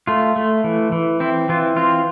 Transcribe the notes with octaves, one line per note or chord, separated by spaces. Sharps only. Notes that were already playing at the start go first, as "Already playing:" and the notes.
A3 F4
A3
E3
E3
C4 E4
E3 F4
C4 F4